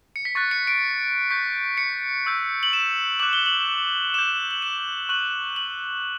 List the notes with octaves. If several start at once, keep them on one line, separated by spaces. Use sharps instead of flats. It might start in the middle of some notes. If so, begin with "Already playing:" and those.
C#7
B6
C#6 F#6 A6
C#7
D7
C#6 G6 B6
C#7
C#6 E6 G6
F#7
E7
D6 F#6 F#7
G7
F#7
D6 G6 E7
F#7
E7
C#6 F#6 F#7
F#7